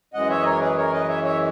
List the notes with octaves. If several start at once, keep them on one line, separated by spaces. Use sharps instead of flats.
F#2 E3 G#3 D#5 F#5
C#5 E5
D#5
A#4 C#5
G#4 B4
A#4 C#5
B4 D#5
C#5 E5
C#5 E5